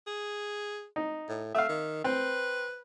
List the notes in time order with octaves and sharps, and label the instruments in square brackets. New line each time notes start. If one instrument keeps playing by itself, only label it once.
[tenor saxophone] G#4
[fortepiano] D#4
[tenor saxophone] A2
[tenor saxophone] A3 [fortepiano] E5 F5
[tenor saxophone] D#3
[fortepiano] C4 [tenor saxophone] B4